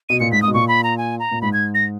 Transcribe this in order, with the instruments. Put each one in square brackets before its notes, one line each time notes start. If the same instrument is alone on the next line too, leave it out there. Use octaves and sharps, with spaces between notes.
[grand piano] B2 [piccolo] D#7
[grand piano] A#2 [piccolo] C#7
[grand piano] G#2 [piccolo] B6
[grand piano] G#2 [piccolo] D#6
[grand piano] B2
[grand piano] A#2 [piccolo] C#6
[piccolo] B5
A#5
G#5
A#5
[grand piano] A#2
[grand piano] G#2 [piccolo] B5
[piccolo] G#6
A#6